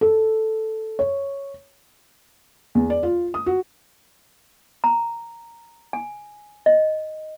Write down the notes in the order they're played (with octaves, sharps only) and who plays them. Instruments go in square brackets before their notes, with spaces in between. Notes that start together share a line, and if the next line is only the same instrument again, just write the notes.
[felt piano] A4
C#5
E2
D5
F4
D#6
F#4
[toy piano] A#5
G#5
D#5